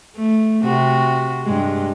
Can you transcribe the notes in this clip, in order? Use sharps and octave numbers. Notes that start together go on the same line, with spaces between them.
A3
C3 F#4
G2 G#3